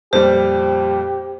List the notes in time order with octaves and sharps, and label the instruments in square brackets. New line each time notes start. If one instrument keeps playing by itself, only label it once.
[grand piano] F2 A#2 G3 [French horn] G4 [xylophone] C5